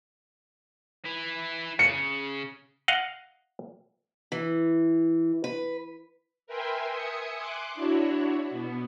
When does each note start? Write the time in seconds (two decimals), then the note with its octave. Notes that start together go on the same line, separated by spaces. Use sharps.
1.05 E4 B4
1.79 C#3 C#7
2.88 D#5 F5 F#5
4.32 E3
5.44 B4
6.47 A#4 B4 E5 G5 G#5 C6
6.89 E5 G#5 D#6 C#7
7.37 C6 D6 F#6
7.74 D4 E4 F#4 C#5
8.50 B2 B3